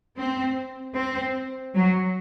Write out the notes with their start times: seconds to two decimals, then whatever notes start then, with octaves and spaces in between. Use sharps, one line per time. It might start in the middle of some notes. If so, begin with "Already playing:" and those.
0.16 C4
0.95 C4
1.75 F#3